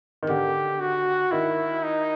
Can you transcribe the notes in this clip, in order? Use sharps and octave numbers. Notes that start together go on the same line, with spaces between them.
D#3
D3 G4
F#4
D#3 E4
D#4